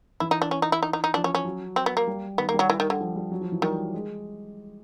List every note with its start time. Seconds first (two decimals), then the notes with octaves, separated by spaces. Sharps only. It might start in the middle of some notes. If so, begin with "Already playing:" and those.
0.20 E3 E4
0.31 D#4
0.42 D4
0.51 C#4
0.62 D#4
0.72 E4
0.83 D#4
0.93 D#4
1.04 D#4
1.14 F3 D4
1.24 C#4
1.35 C#4
1.45 F#3
1.76 C4
1.86 B3
1.97 A#3
2.07 G3
2.38 D#3 B3
2.49 A#3
2.54 G3
2.59 F#3
2.70 E3
2.80 D#3
2.90 D3
3.00 F3
3.16 G3
3.31 F#3
3.41 F3
3.52 E3
3.62 D#3 G3
3.94 G#3